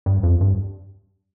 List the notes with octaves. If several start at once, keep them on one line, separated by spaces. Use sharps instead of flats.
G2
F2
G2